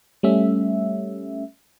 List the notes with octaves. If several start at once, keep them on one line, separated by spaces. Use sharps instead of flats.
G3 A3 C#4 E5